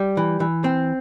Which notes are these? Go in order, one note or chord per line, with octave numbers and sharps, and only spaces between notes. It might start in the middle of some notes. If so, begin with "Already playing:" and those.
Already playing: G3
E3
E3
C4